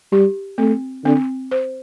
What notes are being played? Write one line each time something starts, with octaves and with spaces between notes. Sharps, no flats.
G3 G4
A3 C4
D3 C4
C5